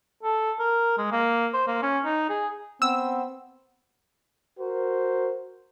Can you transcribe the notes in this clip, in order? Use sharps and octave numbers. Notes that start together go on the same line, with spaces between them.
A4
A#4
G#3
A#3
C5
A#3
C#4
D#4
G#4
B3 C4 E6
F#4 A#4 C5